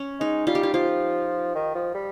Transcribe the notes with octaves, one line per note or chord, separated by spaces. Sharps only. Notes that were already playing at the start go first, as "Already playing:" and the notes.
Already playing: C#4
G#3 D#4
G3 F4
G4
F4
F3 F4
D#3
F3
G3